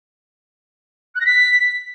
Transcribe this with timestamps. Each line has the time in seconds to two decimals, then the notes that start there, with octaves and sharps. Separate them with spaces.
1.15 F#6
1.20 A#6
1.25 B6